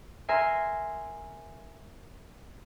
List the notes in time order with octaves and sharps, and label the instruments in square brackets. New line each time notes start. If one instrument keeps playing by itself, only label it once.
[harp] A#4 E5 G#5 C6